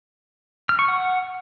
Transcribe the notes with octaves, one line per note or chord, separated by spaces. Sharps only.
F6
C#6
F#5